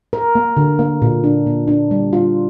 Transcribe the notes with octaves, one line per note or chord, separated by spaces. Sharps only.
A#4
A#3
D3
A#3
A#2
D4
A#2
D4
G3
F4